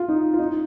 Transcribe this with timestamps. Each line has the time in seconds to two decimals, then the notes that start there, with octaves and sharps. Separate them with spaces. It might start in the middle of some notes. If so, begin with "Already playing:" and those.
Already playing: F4
0.08 D#4
0.33 F4
0.39 D#4